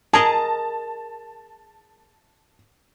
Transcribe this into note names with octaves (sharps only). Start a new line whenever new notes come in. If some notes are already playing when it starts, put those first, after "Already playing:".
G#4 A#4 D#5 A5